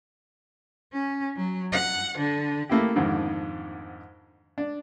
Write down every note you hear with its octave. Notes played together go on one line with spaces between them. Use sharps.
C#4
F#3
F#5
D3
A3 A#3 E4 G4
F2 G#2 D3 D#3
D4